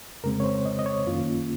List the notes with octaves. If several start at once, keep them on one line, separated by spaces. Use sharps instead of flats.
F2 C#3 G#3 C4 A#4
C#5
C5
D#5
D#5
C#5
F#2 D#3 A#3 C#4 F4